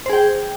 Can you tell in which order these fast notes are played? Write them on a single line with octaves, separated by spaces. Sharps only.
C5 G#4 G5